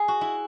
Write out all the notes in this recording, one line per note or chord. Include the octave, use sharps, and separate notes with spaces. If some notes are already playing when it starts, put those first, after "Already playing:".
Already playing: G#4
F#4
E4